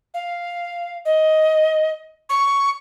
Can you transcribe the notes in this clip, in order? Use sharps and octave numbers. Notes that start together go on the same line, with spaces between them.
F5
D#5
C#6